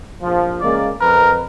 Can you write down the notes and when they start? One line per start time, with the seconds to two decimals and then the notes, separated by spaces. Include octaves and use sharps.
0.23 A#1 F3
0.61 C#3 G#3 A#3 D5
1.01 F2 A#4 B4